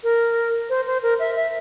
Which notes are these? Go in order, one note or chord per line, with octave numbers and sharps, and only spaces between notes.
A#4
C5
C5
A#4
E5
E5